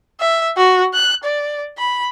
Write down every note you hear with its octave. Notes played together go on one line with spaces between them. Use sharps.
E5
F#4
F#6
D5
B5